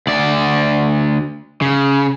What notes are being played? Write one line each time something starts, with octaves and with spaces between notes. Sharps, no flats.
D2 D5
C#3